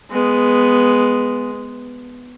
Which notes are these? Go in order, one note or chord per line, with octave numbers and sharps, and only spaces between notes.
G#3 B3